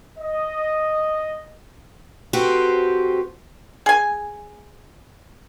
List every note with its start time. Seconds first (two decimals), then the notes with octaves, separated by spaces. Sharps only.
0.18 D#5
2.33 C4 F#4 G4 A4 B4 C5
3.86 G#4 G#5